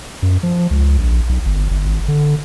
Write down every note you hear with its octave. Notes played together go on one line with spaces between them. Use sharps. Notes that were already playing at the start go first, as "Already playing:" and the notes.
F#2
F3
C#2
A#1
B1
G1
G1
G#1
D3